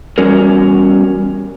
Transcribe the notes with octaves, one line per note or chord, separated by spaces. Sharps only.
E2 G3 C#4 F#4 A#4